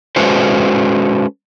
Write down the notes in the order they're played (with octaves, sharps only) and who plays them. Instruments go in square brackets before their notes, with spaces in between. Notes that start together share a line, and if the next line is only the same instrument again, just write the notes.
[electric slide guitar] G#3 C#4 F#4 A4 B4 C5